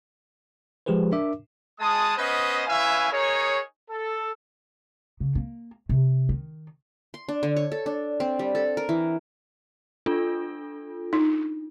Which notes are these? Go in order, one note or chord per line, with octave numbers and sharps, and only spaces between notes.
F3 G#3 G4 G#4 B4 C5
D4 A#4 E5 D6
G#3 A5 D#6
B3 C#4 B4 C5 D#5
C#4 E4 B4 E5 F5 G#5
D#4 G#4 A#4 C#5
A4
C#3
A#3
C3
D#3
C6
D4
D3
C#5
A4
D4
C4
G3
A4
A#4
E3
D4 F4 A4
D#4